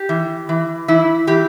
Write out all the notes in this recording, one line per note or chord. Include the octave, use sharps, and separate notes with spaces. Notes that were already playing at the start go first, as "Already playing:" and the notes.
Already playing: G4
E3
E3
E3 E4
E3 G4